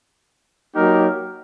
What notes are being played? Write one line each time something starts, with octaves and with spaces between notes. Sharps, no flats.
F#3 A#3 D#4 G4 A#4